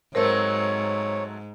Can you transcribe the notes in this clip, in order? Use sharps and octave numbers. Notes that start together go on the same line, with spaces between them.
G#2 F#3 A3 C4 A#4 C5 C#5